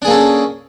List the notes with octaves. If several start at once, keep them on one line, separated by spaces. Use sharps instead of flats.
A#3 C#4 D4 G#4 A4